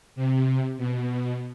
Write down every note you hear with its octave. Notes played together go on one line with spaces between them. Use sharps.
C3
B2